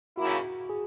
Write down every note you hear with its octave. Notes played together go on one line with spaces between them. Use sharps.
D#2 C#3 F#3 A#3 E4 F#4
G#4